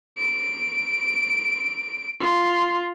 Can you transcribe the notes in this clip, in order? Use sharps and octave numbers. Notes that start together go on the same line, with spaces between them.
D7
F4